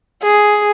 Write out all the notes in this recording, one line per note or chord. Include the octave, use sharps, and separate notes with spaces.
G#4